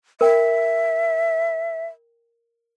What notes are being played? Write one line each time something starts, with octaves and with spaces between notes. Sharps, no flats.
A#4 E5 G5